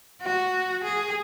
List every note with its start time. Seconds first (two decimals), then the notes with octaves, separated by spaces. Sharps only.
0.22 F#4
0.84 G#4